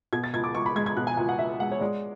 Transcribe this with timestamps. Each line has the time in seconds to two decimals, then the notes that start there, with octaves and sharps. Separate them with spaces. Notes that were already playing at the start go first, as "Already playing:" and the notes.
0.13 B2 G#6
0.24 A6
0.33 C#2 G#6
0.44 D6
0.54 C#2 C#6
0.66 B5
0.76 G#3 G#6
0.86 G#6
0.97 B2 F#6
1.07 G#5
1.17 C#2 G#5
1.29 F#5
1.39 C#2 E5
1.60 G#3 F#5
1.72 C#5
1.80 G#3 D5